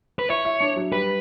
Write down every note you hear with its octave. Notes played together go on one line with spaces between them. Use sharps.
B4
E4 C#5
E4
D4
F#3
G3 B4